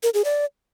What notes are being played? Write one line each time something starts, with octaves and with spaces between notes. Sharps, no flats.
A#4
G#4
D5